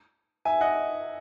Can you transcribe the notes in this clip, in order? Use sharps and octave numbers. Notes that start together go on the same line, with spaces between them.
E5 G#5
D#5 F#5